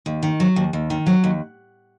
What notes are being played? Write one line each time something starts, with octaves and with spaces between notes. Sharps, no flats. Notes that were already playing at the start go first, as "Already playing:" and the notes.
D#2
D#3
F#3
D#2
D#2
D#3
F#3
D#2